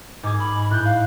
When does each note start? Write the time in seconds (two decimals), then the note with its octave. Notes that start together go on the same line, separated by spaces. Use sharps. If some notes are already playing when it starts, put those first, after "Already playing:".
0.23 G#2 G#4 D6
0.39 B5
0.71 A2 F#6 G6
0.85 F5